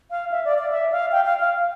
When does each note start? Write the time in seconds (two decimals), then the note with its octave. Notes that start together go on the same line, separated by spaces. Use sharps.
0.11 F5
0.31 E5
0.45 D5
0.59 D5
0.72 E5
0.92 F5
1.12 G5
1.25 F5
1.40 F5